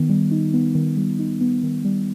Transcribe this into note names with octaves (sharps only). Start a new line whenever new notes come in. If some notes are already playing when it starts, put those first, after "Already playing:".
Already playing: D#3 B3 D#4
G3
D#4
B3
D#3
G3
D#4
B3
D#3
G3